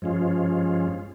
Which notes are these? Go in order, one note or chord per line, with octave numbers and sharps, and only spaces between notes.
G2 F3 G#3 C#4 F4